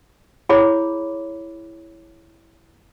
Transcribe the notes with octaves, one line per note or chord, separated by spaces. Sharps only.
E4 G#4 C#5 B5 D6